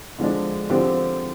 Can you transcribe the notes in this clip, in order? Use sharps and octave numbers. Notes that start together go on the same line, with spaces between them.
D3 F3 G#3 D4
D3 F3 C4 G4